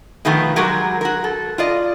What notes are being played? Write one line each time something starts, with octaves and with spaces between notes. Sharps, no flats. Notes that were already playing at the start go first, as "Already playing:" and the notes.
B2 D#3 F3 A3 B3
F#3 G#3 F#4 G4 A#4
F#4 A#4
A4
F4 D5 D#5